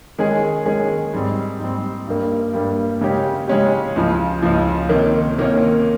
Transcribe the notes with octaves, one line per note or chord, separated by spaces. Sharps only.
D#3 G#3 C#4 G#4
D#3 G#3 C#4 G#4
G#2 G3 C4
G#2 G3 C4
G2 G3 A#3
G2 G3 A#3
C#3 G#3 C#4 G4
C#3 G#3 C#4 G4
C#2 C#3 F3
C#2 C#3 F3
C3 D#3 A#3 C#4
C3 D#3 A#3 C#4